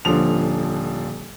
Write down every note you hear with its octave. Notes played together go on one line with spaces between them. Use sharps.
D#1 D3 F3 F7